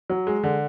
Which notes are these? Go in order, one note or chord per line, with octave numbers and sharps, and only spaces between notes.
F#3
G#3
D3